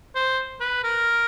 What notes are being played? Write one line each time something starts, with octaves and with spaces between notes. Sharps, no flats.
C5
B4
A#4